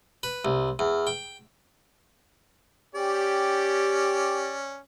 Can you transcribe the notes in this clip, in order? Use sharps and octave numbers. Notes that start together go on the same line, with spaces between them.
B4
C2
E2
G5
C#4 G4 D5